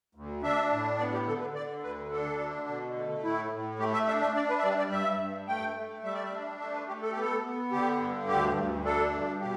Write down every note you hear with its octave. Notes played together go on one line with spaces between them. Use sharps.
D2
D4 E5
A2
B3 D5
G4
D3 A4
B4
D3 D5
D2 B4
D4 A4
D3
B2
A3
A2 E4
A2
A3 G4
E5
D4 E5
E5
D4 D5
B4
E5
G3 D5
D5
G2 E5
G2
A3 G5
A3
G3 E5
D5
E5
D4
A3 E5
B4
A3 G4
A4
G4
B3 A4
B3
D3 G4
G2
D2 G4
D2
D4 A4
G2
B2 G4